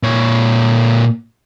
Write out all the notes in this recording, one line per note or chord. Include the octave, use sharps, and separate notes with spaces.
A#2 C#5